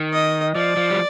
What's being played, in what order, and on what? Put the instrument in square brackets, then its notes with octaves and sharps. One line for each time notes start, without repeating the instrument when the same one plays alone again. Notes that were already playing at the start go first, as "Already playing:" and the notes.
Already playing: [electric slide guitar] D#3
[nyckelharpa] D#5
[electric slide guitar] F3 [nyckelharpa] D5
[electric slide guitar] F3
G3